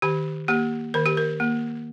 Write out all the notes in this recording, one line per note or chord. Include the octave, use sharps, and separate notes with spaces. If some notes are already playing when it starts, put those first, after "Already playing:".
D#3 G4
A#3 G4
D#3 A#4
G4
A#4
A#3